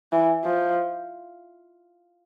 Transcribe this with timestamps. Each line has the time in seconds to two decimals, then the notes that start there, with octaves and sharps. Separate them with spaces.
0.12 E3
0.44 F3